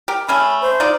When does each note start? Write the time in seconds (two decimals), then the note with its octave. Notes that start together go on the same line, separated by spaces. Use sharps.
0.08 G4 A#4
0.28 A3 C#4 G#4 B5
0.62 C5
0.80 D#4 F4 D5